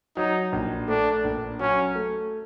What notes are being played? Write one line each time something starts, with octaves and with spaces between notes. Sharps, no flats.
F#3 D#4
A#1
A3 D4
A#1
F#3 C#4
A3